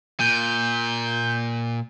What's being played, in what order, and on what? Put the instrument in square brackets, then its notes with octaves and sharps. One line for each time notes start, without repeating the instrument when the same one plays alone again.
[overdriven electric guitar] A#2 [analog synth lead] G6